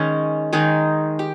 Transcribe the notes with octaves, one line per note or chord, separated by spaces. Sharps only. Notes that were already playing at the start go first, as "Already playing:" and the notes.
Already playing: D#3 G#3 C#4
D#3 G#3 D#4 G#4
G4